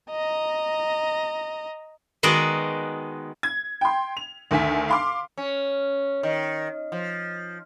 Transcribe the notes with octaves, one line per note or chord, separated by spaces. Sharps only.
D#5 A#5
D#3 G#3 B3 F#4 G#4 D5
G#6
G5 C6
F7
D2 D#3 G#5 B6
F5 C6 D6
C#4
D#3
F3